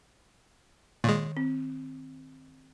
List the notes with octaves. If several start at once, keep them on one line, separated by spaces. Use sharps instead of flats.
A#2 D#3 G#3
C4